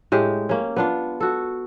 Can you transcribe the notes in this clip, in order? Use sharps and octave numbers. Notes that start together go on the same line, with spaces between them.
A2 G#3 G4
A#3 C#4
B3 D4 F4
F#4 A4